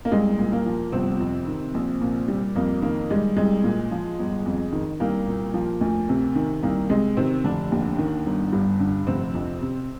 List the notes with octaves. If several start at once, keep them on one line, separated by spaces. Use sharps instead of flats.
A#3
C2 G#3
A#2
A#3
F3
G1 C3 C4
F2
D#3
A#1
A#2
G3
F2 A#3
D#3 A#3
G3 G#3
C2 G#3
A#2
F3
G1
F2
D#3
C2 A#3
A#2
F3
D2
C3
D#3
C2 A#3
C3 G#3
C3 D#3 C4
F1 D3 D4
D#2
D#3
G1
G2
D3
F1 C3 C4
F2
C3